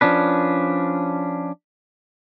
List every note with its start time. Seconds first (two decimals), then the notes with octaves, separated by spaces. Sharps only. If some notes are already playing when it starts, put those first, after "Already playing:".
0.01 F3 C#4 D4 B4